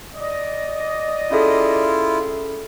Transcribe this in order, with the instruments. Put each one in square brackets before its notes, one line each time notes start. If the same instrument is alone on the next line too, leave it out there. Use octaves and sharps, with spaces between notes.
[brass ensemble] D5 D#5
[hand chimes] C#4 G#4 A4 [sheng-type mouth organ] E4 F4